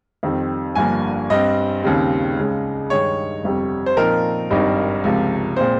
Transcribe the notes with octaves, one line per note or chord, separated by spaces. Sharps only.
F2 D#3 G3 C4
G1 G2 F3 A#3 G#5
G2 G3 C4 D#5
D#2 C#3 G3 C4
C#2 C#3 G#3
G2 D#3 G#3 D#4 C#5
G1 F2 C3 G3
C5
A#2 F3 C4 D#4 A#4
G#1 G2 G3 C4 D#4
C#2 C3 F3
A#2 G#3 C4 C5